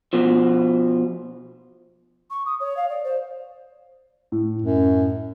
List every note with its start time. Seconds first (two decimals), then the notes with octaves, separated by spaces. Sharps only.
0.13 B2 F3
2.31 C#6
2.46 D#6
2.60 C#5
2.77 F5
2.89 D5
3.04 C5
4.32 A2
4.62 F#2